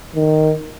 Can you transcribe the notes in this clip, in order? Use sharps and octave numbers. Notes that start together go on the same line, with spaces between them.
D#3